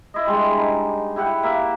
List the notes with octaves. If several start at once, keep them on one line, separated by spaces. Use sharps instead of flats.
E4 D#5
G3 G#3 D4
D#4
E4 G4 F#5
A#3 E5